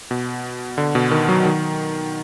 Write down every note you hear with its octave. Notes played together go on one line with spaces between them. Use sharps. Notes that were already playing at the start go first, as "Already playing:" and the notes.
B2
D3
B2
D#3
F#3
D#3